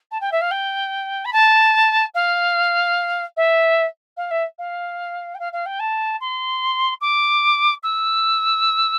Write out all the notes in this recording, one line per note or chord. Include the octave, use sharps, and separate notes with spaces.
A5
G5
E5
F5
G5
B5
A5
F5
E5
F5
E5
F5
G5
F5
F5
G5
A5
C6
D6
E6